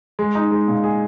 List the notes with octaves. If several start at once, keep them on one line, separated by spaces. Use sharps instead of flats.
G#3
D#4
G#3
A#2
G#4